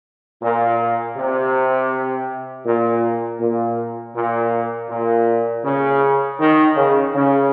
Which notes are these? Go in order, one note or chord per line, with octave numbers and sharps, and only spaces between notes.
A#2
C3
A#2
A#2
A#2
A#2
C#3
D#3
C#3
C#3